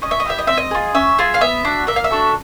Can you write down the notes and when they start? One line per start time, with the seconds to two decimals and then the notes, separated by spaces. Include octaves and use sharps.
0.02 C#4 D#5
0.11 E5
0.20 D#5
0.25 E4 G4 E5
0.39 D#5
0.47 C4 E5
0.58 D#5
0.71 F4 G#4
0.95 C#4 E5
1.19 F4 G#4
1.34 F5
1.41 B3 E5
1.65 D4 F#4
1.87 A#3 E5
1.96 F5
2.04 E5
2.11 D4 F#4 A4